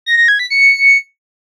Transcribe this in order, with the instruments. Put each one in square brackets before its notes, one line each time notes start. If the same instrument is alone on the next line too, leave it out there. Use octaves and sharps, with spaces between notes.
[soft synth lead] A#6
A#6
G#6
B6
C#7